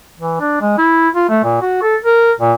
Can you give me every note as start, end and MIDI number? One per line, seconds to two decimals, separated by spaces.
0.19 0.40 52
0.40 0.60 62
0.61 0.76 56
0.78 1.09 64
1.15 1.26 65
1.29 1.39 57
1.44 1.60 46
1.61 1.82 66
1.82 1.96 69
2.04 2.32 70
2.40 2.53 46